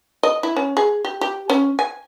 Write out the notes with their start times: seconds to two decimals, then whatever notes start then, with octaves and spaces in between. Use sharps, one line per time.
0.23 D#5
0.43 E4
0.56 C#4
0.77 G#4
1.05 G4
1.21 G4
1.50 C#4
1.79 G#5